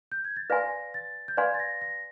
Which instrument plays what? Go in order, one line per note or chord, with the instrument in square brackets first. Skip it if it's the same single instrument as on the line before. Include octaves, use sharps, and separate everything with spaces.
[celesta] G6
G#6
A6
[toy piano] B4 D5 F5 G#5 C6 [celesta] A#6
[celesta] A6
G6
[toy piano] B4 D5 F5 G#5 C6 [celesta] G#6
[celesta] A6
A#6
A#6